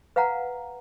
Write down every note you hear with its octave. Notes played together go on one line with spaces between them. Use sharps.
B4 F5 F#5 A#5